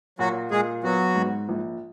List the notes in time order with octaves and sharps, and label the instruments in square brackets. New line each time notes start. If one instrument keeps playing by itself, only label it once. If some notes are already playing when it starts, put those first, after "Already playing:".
[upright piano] A#2 [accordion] F#3 F#4
[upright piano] A#2 [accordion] G#3 G#4
[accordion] F#3 F#4 [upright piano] B3
[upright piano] G#2
A#1